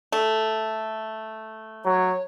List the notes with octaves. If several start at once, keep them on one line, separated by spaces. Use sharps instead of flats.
A3
F#3 C#5